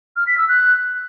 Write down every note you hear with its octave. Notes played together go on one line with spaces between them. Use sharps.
F6
B6
E6
F#6